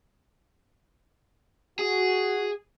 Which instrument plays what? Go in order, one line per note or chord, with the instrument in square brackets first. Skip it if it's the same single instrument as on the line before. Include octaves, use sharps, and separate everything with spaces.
[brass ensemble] F#4 [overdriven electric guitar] G#4